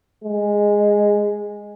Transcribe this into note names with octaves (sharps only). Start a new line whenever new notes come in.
G#3